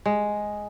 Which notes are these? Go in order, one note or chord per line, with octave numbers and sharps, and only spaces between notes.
G#3